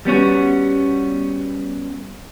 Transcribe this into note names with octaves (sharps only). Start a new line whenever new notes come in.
G3 B3 C#4 F#4